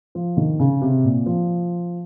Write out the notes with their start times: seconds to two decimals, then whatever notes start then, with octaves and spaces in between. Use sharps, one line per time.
0.15 F3
0.37 D#3
0.60 C#3
0.82 C3
1.04 A#2
1.26 F3